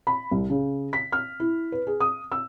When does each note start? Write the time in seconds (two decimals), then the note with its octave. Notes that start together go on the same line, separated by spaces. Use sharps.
0.07 B5
0.31 C2
0.50 C#3
0.93 B6
1.12 F6
1.40 E4
1.72 B4
1.87 G#4
2.00 D#6
2.32 E6